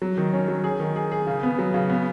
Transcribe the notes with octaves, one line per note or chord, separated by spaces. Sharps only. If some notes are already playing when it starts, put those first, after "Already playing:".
F#3
D#3
C#4
F#3
G#4
D#3
G#4
G#4
C#3
B3
F#3
C#3
B3